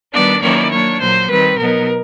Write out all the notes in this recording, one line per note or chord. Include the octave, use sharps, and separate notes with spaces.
D#3 G3 B3 D4 D5
D#3 F#3 A#3 C#4 E4 D5
F#3 A#3 D4 C#5
A#2 F#3 A#3 C5
D#3 G3 C4 B4
B2 F#3 B3 D#4 A#4